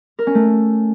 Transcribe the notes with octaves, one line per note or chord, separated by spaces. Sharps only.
A#4
C#4
A3